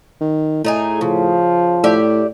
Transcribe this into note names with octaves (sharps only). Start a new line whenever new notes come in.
D#3
A2 A3 D#4 G#4
C#3 F3
A2 G4 D5 E5